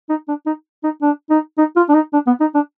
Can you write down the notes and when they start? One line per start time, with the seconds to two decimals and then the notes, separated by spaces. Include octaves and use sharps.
0.09 D#4
0.28 D4
0.46 D#4
0.84 D#4
1.02 D4
1.30 D#4
1.58 D#4
1.76 F4
1.89 D4
1.94 D#4
2.13 D4
2.27 B3
2.40 D#4
2.55 D4